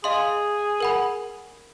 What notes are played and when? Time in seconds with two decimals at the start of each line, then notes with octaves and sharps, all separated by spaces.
0.04 G#4 D#5 F5 C6
0.80 A#4 F#5 B5